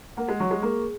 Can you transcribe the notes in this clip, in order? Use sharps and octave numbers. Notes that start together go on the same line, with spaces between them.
A#3 F#5
G#3
F#3 C#6
G#3
A#3 G#4